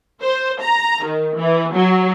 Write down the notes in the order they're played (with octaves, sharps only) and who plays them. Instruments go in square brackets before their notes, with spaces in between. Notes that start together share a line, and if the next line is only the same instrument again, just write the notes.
[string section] C5
A#5
D#3
E3
F#3